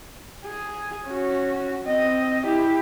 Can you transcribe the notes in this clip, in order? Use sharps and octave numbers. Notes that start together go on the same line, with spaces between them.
G#4
C#4 F#4
C4 D#5
E4 G4